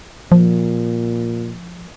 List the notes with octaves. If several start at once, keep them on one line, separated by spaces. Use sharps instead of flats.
A#2 F3